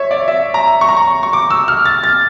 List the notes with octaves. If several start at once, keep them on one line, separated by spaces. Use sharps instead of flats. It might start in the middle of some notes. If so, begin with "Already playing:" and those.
Already playing: C#5 E5
D5
E5
A#5
C#6
A#5
C#6
C#6
D6
E6
F6
A6
A6